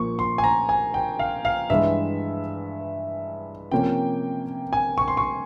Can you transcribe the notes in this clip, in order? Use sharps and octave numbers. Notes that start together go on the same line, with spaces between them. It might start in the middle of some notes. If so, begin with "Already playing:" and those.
Already playing: A#2 F3 A#3 C#6
C6
G#5
A#5
G#5
G5
F5
F5
G2 E3 G#3 E5
C3 F3 A#3 C#4 G5
G#5
C#6
C6
C#6